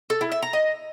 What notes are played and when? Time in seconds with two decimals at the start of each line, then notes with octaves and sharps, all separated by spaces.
0.10 A4
0.21 E4
0.32 E5
0.42 A#5
0.53 D#5